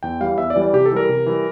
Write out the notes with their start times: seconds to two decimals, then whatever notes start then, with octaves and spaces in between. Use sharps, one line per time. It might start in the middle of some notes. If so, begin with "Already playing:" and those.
0.03 E2 G5
0.21 E3 G3 F5
0.38 E2 E5
0.50 D5
0.56 E3 G3
0.62 D5
0.73 C3 G4
0.86 A4
0.92 E3 G3 A#4
1.09 C3
1.26 E3 G3